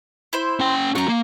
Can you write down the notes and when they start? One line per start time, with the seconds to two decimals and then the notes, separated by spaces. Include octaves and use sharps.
0.33 E4 C5
0.60 C#4 G5
0.95 C#4 F#4 A#5 C#6
1.09 A#3